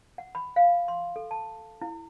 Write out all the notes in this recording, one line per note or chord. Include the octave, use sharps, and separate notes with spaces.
F#5
B5
F5
C6
A4
A5
E4